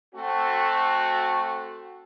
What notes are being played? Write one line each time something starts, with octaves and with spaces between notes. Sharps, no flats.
A3 C4 F#4